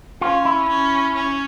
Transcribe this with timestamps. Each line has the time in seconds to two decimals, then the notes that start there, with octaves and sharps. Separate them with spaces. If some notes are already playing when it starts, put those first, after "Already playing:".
0.21 C#4 F4
0.45 E4
0.69 C#4
1.15 C#4